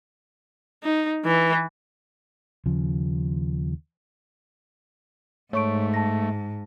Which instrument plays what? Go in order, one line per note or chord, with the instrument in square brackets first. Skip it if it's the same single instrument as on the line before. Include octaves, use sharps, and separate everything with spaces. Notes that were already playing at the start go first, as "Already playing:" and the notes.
[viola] D#4
E3
[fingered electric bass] D#2 C#3 F3
[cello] G#2 [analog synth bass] A3 [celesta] C#5 C#6 D7
[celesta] A5 A#6